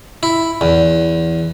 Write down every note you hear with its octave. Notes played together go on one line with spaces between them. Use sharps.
E4
E2